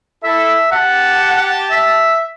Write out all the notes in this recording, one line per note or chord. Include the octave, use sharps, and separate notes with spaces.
E4 A4 E5
G4 F#5 A5
E5